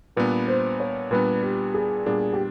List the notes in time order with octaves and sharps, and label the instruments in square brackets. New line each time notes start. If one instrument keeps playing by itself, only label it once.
[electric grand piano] A#2 G3 B3 D4 [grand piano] B4
[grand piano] C5
C#5
[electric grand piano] A#2 G3 B3 D4 [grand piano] B4
[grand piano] G4
G#4
[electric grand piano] A#2 G3 B3 D4 [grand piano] G#4
[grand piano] G4